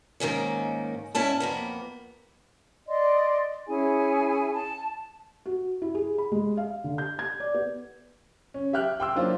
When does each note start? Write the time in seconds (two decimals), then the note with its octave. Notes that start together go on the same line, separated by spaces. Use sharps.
0.20 G#2 D#3 A#3 C#4
1.15 G#2 C#4 E4 A5
1.40 F2 A#3 B3
2.87 D5 D#5 C6
3.67 C#4 E4 G#4 G#5
4.53 A5
5.46 F#4
5.82 E4
5.95 G#4
6.18 B5
6.32 G#3
6.57 F5
6.84 D3
6.98 G6
7.19 G#6
7.40 D5
7.54 B3
8.54 C#4
8.73 G4 E5 G5 F6 F#6
9.00 G5 C6 E6
9.15 F#3 A#3 D4 E4 F4 C5